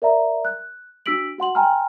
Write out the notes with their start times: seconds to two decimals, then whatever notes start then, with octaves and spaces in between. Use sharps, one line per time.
0.02 A#4 D5 E5 A#5
0.45 F#6
1.06 D4 F#4 E6 B6 D7 F#7
1.38 F#4 F#5 C6 F#7
1.55 G5 G#5 A#5 C6 F6